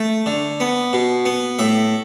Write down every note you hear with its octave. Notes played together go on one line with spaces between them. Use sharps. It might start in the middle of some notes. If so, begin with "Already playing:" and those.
Already playing: A3
D3
B3
B2
B3
A2 E5